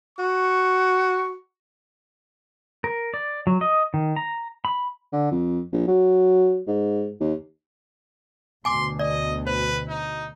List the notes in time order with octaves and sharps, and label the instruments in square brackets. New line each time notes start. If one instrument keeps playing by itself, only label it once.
[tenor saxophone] F#4 [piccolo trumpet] C#6
[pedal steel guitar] A#4
D5
F#3
D#5
D#3
A#5
B5
[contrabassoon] D3
F2
A#1
F#3
G#2
D#2
[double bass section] D2 B2 [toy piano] G#5 D6 [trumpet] C6
[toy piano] D5 [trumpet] D#5
[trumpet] B4 [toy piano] C5
[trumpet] D#4